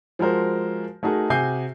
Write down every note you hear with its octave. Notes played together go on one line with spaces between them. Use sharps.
F3 G#3 F#4 A#4 C5
A3 D#4 F#4 G#4 A#4
C3 F#4 G#4 G#5 G6 C7